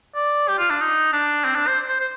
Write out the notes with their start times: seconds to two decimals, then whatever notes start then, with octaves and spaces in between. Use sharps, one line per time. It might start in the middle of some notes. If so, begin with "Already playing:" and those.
0.15 D5
0.48 G4
0.58 F4
0.70 D4
0.80 D#4
1.13 D4
1.45 C4
1.55 D4
1.67 C5
1.89 C5
2.00 C5